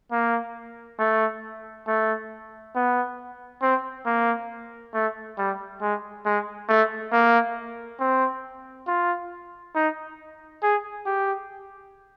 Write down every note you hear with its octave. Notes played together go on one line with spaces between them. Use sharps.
A#3
A3
A3
B3
C4
A#3
A3
G3
G#3
G#3
A3
A#3
C4
F4
D#4
G#4
G4